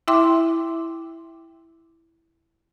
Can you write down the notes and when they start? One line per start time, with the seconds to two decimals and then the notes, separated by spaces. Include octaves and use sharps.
0.08 E4 E5 G5 C6 D6